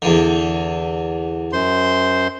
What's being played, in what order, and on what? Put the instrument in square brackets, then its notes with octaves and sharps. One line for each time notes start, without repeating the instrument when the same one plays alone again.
[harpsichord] E2 D3
[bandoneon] F#2 C5 C6